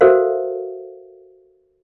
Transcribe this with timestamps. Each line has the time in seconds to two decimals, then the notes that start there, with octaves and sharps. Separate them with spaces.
0.01 F#4 A4 A#4 C5 E5 F5